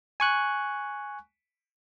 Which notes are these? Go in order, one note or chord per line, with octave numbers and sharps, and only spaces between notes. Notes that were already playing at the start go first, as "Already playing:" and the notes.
G#5 C#6 F#6